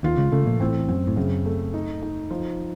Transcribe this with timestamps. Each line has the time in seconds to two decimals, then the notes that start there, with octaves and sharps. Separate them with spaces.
0.03 D#2 D#3 F4
0.17 C#2 C#3
0.32 C#2 C#3 A3
0.46 A#1 A#2
0.60 A1 A2 C4
0.89 F#2 C4
1.07 A2
1.16 F#2 C#3
1.45 A3
1.74 D#4
2.02 D#4
2.31 F3